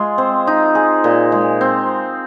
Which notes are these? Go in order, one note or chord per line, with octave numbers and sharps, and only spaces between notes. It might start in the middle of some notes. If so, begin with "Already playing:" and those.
Already playing: G#3 F4
C4
D#4
G#4
A#2
G#3
C4